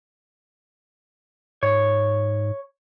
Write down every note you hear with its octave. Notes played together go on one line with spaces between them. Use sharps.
G#2 C#5